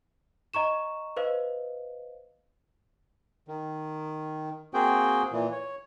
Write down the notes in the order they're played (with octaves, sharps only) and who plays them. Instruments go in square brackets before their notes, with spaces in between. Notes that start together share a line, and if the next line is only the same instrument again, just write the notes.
[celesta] D#5 A#5 C#6 E7
B4 C5 D#5 F5
[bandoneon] D#3
A#3 C4 F#4 G#4 G5
A#2 E3
C#5